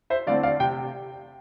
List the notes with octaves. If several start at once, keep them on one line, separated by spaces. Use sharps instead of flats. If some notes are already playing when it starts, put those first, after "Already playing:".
C5 E5
D3 A3 C4 E4 D5 F5
D5 F5
C3 G5